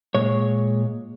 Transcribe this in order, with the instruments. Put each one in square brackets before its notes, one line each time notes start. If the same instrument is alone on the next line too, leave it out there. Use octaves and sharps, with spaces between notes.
[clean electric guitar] A#2 G#3 C#5